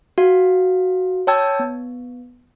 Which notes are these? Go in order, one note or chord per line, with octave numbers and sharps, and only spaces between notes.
F#4 F5
C#5 G5 A5 E6 G#6
B3